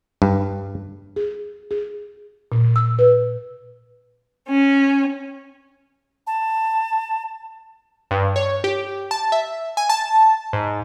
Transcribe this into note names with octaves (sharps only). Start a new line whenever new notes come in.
G2
G#4
G#4
A#2
E6
B4
C#4
A5
G2
C#5
G4
A5
E5
G#5
A5
G#2